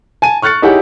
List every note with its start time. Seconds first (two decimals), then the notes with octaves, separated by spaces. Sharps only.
0.22 G#5 A5 D#7
0.42 C#6 F6 F#6 A6 C#7
0.62 D#4 E4 G4 G#4 C#5 F#5